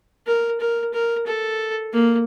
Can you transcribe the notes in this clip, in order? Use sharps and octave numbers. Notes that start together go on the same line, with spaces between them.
A#4
A#4
A#4
A4
A#3